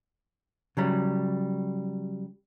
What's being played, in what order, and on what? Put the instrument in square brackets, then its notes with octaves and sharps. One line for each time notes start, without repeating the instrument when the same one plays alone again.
[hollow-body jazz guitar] C#3 F#3 G3